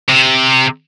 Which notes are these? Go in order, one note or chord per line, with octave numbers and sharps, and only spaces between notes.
C3